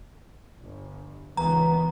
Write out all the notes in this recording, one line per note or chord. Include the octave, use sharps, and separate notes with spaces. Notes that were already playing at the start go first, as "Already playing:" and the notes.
G1
C#2 D#3 E3 B3 A#5